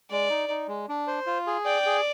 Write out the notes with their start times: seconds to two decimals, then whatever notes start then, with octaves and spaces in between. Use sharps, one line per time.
0.10 G#3 D5
0.29 D#4
0.49 D#4
0.68 G#3
0.89 D4
1.07 C5
1.27 F4
1.47 G#4
1.65 D5 G5
1.86 G#4